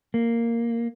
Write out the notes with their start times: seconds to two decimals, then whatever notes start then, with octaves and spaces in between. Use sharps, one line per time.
0.14 A#3